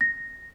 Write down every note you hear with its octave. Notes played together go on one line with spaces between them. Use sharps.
A#6